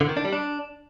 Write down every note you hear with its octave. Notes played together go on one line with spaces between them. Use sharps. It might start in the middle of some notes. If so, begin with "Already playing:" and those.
D3
D#3
D4
G3
D4